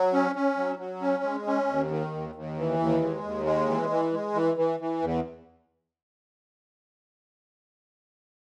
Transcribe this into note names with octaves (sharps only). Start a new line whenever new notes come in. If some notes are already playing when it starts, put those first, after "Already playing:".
Already playing: F#3
C#4
C#4
F#3
F#3
C#4
G#3
C#4
D#2
D#3
D#2
D#2
E3
D#2
G#3
D#2
G#3
E3
E3
G#3
E3
E3
E3
E2